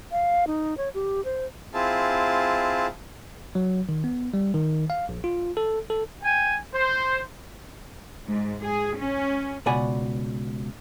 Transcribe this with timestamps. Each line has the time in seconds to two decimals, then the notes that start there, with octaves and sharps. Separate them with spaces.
0.11 F5
0.47 D#4
0.77 C#5
0.94 G4
1.25 C5
1.74 C4 E4 F4 G#4 A5
3.55 F#3
3.89 D#3
4.04 B3
4.34 G3
4.54 D#3
4.90 F5
5.09 A#1
5.24 F4
5.57 A4
5.90 A4
6.23 G5 G#5
6.74 C5
8.27 G#2
8.62 G#4
8.98 C#4
9.66 C#2 B2 D5 F#5 G#5 B5